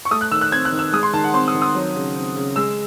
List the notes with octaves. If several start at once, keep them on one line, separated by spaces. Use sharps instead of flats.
C#6
A3 D#6
F#6
D#3 E6
F#6
C4 G#6
F#6
D#3
E6
G#3 D#6
C6
D#3 A5
F#5
C4 C6
D#6
D#3
D#6
F#3
C#3
C4
C#3
G#3 E6